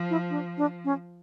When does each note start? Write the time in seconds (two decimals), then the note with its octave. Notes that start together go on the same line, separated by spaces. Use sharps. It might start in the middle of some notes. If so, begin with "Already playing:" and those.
Already playing: F3
0.10 E4
0.30 D4
0.58 D4
0.84 C#4